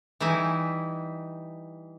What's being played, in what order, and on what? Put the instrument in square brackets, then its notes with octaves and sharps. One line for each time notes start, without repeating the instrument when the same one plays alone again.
[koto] E3 G3 D#4 E4 G#5